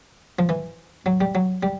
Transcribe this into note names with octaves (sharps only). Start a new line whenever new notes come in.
F3
E3
F#3
G3
F#3
G3